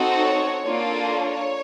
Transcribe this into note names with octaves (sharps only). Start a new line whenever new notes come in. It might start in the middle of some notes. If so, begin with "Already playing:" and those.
Already playing: C4 D#4 F#4 A4
C#5
A#3 D4 F4 A4
C#5